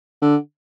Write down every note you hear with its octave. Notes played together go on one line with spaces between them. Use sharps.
D3